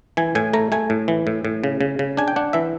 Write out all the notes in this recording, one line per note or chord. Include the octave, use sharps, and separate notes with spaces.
E3 G#5
A2 G#5
A3 A#5
A3 G#5
A2
E3
A2
A2
C#3
C#3
C#3
D4 G#5
G5
D4 F#5
E3 E5